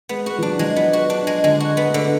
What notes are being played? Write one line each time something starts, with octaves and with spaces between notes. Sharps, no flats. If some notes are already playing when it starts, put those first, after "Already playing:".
G#3 B3
G#3 F#4
F3
F#3 D4
F3 G#3
B3
F#4
D4
G#3
D3 G#3
F#4
B3
A3
D3